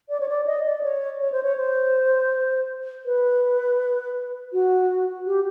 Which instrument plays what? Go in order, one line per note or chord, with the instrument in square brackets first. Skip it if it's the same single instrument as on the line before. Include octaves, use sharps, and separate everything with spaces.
[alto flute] D5
C#5
D5
D#5
D5
C#5
C#5
C5
C#5
C5
B4
F#4
G4